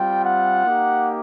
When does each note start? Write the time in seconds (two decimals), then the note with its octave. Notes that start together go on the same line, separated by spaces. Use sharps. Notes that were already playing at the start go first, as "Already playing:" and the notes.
Already playing: G3 C4 F4 G5
0.25 F#5
0.65 A#3 D#4 G4